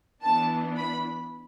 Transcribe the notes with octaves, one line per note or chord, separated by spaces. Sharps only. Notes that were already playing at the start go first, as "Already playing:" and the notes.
E3 B3 D4 A5
B5